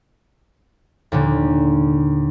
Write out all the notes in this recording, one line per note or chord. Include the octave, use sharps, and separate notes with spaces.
D#2 A#2 D3